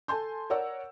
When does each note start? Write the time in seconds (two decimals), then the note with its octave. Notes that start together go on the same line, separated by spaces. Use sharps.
0.08 A4 G#5 A5 C6 G6
0.50 A#4 C#5 D5 F#5 E6